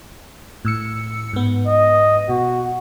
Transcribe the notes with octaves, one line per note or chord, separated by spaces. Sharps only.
A2 E6 C#7
G#2 B3
D#5
B2 F#4